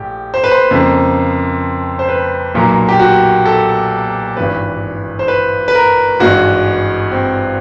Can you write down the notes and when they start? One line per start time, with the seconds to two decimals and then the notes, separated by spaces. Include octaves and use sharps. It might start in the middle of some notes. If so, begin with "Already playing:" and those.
Already playing: A#1 A2 G4
0.34 C5
0.44 B4
0.52 C5
0.71 F2 C#3 F3 A#3
1.99 C5
2.09 B4
2.54 B1 A#2 F#3 A#3
2.89 G4
2.99 F#4
3.46 A4
4.37 G#1 G2 E3 B4
5.19 C5
5.28 B4
5.68 B4
5.75 A#4
6.20 G#1 G2 E3 G#3 F#4
7.12 C4